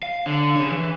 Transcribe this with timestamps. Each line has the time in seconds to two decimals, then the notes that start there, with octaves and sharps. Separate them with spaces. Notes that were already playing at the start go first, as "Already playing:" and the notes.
0.03 F5
0.26 D3
0.56 G#4 C#5
0.71 E3